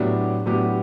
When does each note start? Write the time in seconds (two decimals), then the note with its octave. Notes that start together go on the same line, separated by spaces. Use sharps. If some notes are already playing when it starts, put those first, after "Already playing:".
Already playing: A2 F#3 B3 D4 G4
0.46 A2 F#3 B3 D4 G4